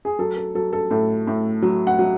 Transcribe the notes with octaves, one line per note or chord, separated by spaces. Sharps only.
G#4
F#3 A4
A4
F#3 A4
A4
A2 A4
A2
F#3
F#5
F#3